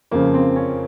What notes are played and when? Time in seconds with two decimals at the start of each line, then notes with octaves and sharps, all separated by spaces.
0.11 F2 C#3 F3 A#3
0.34 C4
0.56 C#4